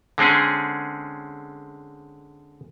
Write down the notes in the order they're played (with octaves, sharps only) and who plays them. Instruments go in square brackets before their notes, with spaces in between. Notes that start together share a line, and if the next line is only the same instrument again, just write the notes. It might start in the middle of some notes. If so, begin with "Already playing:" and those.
[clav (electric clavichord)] D3 G#3 C4 C#4 G#4